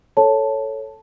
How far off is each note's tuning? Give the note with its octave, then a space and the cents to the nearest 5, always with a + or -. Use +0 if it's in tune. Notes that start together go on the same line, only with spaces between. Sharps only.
A4 +0 C#5 +0 A5 +0